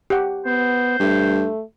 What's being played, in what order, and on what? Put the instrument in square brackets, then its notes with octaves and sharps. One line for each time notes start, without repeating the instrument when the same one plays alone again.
[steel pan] G4 F#5
[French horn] B3 [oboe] C5
[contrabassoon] G2 [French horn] A3